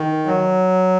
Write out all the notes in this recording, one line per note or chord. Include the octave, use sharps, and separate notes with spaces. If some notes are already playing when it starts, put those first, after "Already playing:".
Already playing: D#3
F#3